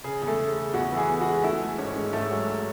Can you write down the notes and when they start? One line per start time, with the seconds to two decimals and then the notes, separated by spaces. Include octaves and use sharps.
0.04 C#3 G#4
0.22 E2
0.27 A3 A4
0.40 C#3
0.57 C#3
0.74 E2 F#4 F#5
0.92 E3
0.97 G#4 G#5
1.09 E2
1.21 F#4 F#5
1.27 G#3
1.44 A3 E4 E5
1.61 A3
1.78 G#1 C#4 C#5
1.96 G#2
2.13 G#2 A3 A4
2.31 F#3